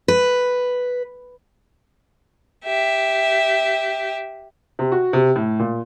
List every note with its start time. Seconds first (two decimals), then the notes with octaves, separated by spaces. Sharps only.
0.08 B4
2.65 G4 E5
4.79 C3
4.92 F#4
5.13 C3
5.36 A2
5.59 A#2